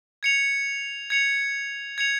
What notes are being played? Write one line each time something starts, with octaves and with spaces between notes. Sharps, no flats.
G#6 C#7 F7
G#6 C#7 F7
G#6 C#7 F7